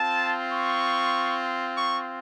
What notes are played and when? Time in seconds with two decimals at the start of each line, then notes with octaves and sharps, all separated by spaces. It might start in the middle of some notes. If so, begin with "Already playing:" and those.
Already playing: C4 F4 A5
0.52 C#6
1.77 C#6